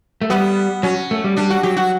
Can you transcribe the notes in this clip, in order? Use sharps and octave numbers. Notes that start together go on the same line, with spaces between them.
A3
G3 B3
F#3 C#4
A3
G3
G3 D4
F#4
F#3 G4
F#4